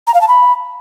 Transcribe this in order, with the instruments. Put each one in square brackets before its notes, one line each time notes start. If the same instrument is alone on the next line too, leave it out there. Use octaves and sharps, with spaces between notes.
[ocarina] A#5
F5
A5
B5